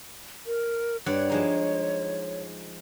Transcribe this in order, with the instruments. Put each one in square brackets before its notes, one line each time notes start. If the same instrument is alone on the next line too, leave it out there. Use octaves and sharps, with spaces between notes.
[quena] A#4
[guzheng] G2 D5 F#5 [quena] C#5
[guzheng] F3 G#3 D#4